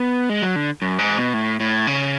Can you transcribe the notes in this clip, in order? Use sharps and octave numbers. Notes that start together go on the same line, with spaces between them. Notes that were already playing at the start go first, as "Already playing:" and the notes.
Already playing: B3
G#3
F#3
D3
F#2
G#2
B2
A2
A2
C#3